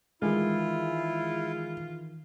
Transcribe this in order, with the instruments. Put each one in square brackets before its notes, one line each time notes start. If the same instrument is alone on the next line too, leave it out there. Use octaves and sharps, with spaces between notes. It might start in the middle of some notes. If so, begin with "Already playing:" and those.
[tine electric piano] D#3 E3 [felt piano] G#3 [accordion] E4 [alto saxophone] F4